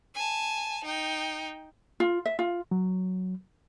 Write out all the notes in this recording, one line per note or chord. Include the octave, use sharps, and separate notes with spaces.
G#5 A5
D#4 G5
F4
E5
F4
F#3